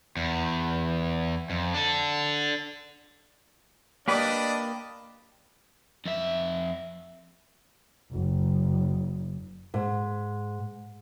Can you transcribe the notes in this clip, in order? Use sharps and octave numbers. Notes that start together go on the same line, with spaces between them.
E2
F2
D4 A4
A#3 D4 G4 B4 D5 D#5
F2 E5
F#1
G#2